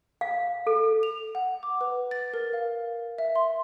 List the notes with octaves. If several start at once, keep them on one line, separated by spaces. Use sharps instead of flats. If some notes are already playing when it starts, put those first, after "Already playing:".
F5
A4
F7
F#5
D6
B4
A6
A#4
F5
E5
C6